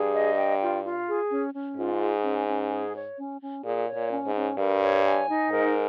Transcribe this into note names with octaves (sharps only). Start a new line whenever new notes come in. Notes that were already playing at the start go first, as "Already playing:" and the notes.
Already playing: G2 G#4
D#5
G5
F4
F4
G#4
C#4
C#4
G#2 F4
G#4
C#4
C#4
G#4
C#5
C#4
C#4
A#2 G#4
C#5
A#2
C#4
G#2
C#4
G2 A#4
C#5
G#5
D#4
G#2 A#4